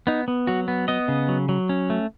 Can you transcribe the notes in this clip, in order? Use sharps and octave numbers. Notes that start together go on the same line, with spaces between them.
B3 D#4
B3
F#3 F#4
B3
B3 D#5
C#3
F#3
F#3
C#4
A3